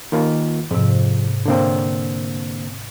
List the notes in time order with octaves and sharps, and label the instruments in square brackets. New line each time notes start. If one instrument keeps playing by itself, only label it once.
[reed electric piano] D#3 A#3 F4
[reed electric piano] F2 [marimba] G#2 C3
[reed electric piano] D3 A#3 C4